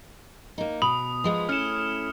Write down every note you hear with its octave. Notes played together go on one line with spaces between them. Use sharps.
A#3 D#4
B2 B5 D#6
F3 G#3 B3
A3 C#4 E4 F6 C#7 E7